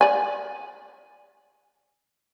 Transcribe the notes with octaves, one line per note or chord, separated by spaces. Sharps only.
D5 G#5